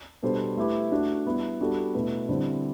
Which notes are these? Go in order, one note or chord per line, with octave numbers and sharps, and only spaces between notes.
B2 G3 D4 A4 C5
A3 E4 G4 B4
A3 D4 F#4
G3 B3 E4
G3 B3 D4 F#4 A4
B2 A3 E4 B4
D3 G3 C4 E4